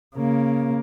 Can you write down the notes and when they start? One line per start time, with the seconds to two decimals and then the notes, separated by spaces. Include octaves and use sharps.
0.16 C#3 A#3